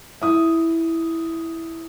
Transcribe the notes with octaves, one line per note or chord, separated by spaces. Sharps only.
E4 D#6